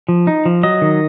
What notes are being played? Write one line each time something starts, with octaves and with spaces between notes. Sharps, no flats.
F3
D#4
F3
F#3 D#5
D#3